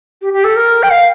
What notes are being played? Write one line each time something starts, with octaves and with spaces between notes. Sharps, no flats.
G4
G4
A4
A#4
G5
F5